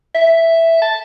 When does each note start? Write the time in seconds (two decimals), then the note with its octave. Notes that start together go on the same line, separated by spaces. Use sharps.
0.15 E5
0.82 A5